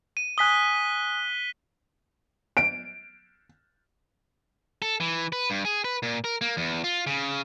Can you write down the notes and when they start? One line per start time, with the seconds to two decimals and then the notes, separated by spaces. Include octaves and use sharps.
0.17 D#7
0.38 G#5 D#6 F#6 B6 G7
2.57 D7
4.82 A4
5.00 E3
5.32 B4
5.50 G2
5.65 G#4
5.85 B4
6.03 A#2
6.24 A#4
6.41 A#3
6.57 E2
6.84 F4
7.07 C#3